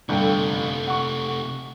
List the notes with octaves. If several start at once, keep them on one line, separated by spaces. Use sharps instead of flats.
G1 C3 A3 A4 G5
F#5 C#6